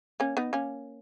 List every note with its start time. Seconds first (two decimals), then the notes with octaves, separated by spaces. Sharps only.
0.20 A#3 C#4
0.37 B3 D#4
0.53 A#3 C#4